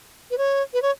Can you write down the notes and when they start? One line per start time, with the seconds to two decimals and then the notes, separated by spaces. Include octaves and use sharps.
0.31 B4
0.38 C#5
0.74 B4
0.82 C#5